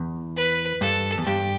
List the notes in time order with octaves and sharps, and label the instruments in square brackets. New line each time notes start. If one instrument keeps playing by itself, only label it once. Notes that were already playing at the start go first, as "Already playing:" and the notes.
Already playing: [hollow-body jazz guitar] E2
[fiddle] B4
[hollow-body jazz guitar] G2 [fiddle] A4
[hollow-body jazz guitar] E2
[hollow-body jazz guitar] G2 [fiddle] G4